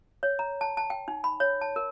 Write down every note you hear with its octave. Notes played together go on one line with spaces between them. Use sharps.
C#5
A#5
A5
A5
G5
D#4
B5
C#5
A5
A#4